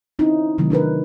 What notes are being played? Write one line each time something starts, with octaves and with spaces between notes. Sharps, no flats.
C4 C#4 D#4 E4
C3 D#3 E3 F#3 A3 C4
D4 D#4 A#4 B4